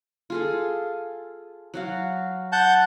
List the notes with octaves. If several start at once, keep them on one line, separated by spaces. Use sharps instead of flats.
F4 G#4 A4
F#3 F#4 F5
F#5 A5 G6